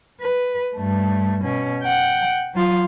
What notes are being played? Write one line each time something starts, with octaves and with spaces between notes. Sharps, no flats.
B4
G2 A3
B2 C#4
F#5 G5
F#3 F4